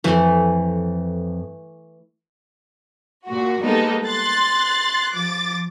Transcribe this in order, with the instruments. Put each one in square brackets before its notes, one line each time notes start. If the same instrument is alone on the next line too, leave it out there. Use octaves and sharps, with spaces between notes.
[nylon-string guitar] F2 [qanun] E3 A3
[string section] A#2 F#4
G3 G#3 A#3 B3 D#4 A4
C6 F#6 A6
F3 D6 A6